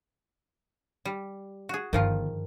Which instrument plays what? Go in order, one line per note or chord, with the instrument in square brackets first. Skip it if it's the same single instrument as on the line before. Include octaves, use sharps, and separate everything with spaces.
[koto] G3
F#4 G#4
[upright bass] G1 [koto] D#3 F3 F4